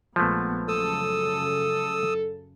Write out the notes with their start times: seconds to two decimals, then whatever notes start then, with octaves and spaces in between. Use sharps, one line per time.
0.16 A#1 F3 G#3 A3 B3
0.68 F#2 C#3 A4 D#6 E6